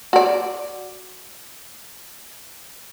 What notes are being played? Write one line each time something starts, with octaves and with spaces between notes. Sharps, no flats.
F#4 D5